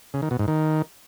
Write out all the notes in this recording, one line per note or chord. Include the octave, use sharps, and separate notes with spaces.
C#3
D#3
B2
G#2
D#3